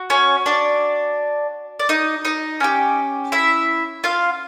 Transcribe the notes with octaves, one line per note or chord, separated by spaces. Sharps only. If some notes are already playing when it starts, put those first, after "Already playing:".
Already playing: F#4
C#4 C#5
D4 D5
D5
D#4 D#5
D#4 D#5
C#4 E4 G4
E4 E5
F4 F5